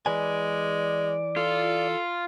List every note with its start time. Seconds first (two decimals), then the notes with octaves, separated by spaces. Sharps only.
0.06 E3 G#3 B4 D5 G#5
1.36 F4 A4